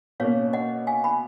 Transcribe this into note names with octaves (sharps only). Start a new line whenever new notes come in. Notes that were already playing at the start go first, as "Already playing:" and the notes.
B2 A#3 C#4 C#5 F5
D#5 F#5
F5 G#5
G#5 B5